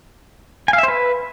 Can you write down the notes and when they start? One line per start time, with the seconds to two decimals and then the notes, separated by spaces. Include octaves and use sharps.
0.68 G#5
0.73 F5
0.78 E5
0.83 C5
0.88 B4